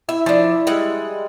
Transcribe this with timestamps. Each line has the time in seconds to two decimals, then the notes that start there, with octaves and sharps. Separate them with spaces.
0.09 E4 E5
0.26 F3 D4
0.67 G3 G#3 F#5